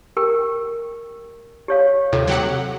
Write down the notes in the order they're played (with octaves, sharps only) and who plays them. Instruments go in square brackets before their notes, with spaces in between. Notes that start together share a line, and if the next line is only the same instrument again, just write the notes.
[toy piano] G4 A#4 G5
G4 C#5 F5
[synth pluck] D#2 C3 [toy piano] F4 A4
[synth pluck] F#3 G4 F#5